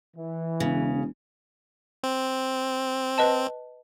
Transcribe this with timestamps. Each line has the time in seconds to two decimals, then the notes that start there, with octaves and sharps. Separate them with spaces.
0.16 E3
0.60 E1 C#3
2.03 C4
3.18 B4 D#5 A5